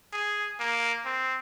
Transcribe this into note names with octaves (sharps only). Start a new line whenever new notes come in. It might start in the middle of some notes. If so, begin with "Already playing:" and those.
G#4
A#3
C4